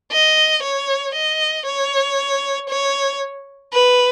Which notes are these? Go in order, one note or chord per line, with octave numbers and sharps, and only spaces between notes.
D#5
C#5
D#5
C#5
C#5
B4